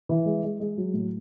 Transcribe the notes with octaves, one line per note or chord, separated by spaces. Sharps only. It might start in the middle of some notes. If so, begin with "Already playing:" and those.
E3
G#3
G#3
G#3
F#3
A2